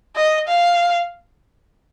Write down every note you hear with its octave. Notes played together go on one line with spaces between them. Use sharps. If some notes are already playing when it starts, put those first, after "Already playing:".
D#5
F5